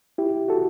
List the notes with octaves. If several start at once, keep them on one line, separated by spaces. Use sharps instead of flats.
E4 G4
F#4 A4